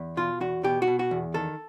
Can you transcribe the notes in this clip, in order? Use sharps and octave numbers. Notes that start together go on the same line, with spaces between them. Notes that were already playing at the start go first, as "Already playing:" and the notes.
Already playing: E2
B2 F4
E2 F#4
B2 G4
F#4
B2
F#4
E2
D#3 A4